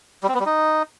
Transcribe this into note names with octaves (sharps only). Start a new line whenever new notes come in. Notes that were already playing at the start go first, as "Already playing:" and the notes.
G3
C4
B3
G3
D#4